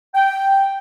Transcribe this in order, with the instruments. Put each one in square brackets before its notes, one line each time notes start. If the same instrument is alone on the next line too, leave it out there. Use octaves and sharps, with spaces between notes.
[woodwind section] G5